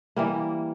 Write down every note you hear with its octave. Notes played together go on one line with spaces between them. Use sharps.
E3 G3 A#3